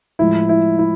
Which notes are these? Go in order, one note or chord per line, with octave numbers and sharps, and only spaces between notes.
A2 F3 G#3 E4
E4
E4